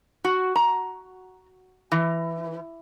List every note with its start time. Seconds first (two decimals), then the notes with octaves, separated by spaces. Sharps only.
0.24 F#4
0.56 A#5
1.92 E3